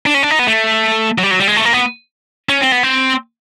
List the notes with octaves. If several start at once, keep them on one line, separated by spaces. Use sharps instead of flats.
D4
C#4
D4
D#4
B3
A3
F#3
G3
F#3
G3
G#3
A3
A#3
B3
C#4
C4
B3
C4